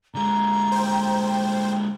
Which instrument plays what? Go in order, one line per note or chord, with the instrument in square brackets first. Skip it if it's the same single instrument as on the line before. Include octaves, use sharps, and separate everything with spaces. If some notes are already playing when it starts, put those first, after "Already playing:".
[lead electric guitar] D3 G#3 [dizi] A#5
[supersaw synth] C5 G5